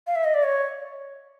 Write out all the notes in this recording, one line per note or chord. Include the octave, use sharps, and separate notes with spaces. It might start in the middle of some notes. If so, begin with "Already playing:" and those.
F5
E5
D#5
D5
C#5